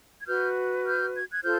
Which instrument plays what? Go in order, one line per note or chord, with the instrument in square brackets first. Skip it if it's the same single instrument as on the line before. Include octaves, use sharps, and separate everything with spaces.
[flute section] G#6
F#4 B4 F6 G6
F6 G6
G#6
F#6 G#6
F4 A4 C5 F6 G6